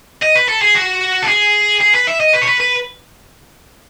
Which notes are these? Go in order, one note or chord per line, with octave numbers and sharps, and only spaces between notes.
D#5
B4
A4
G#4
F#4
A4
G#4
G#4
B4
E5
D#5
B4
C#5
B4
B4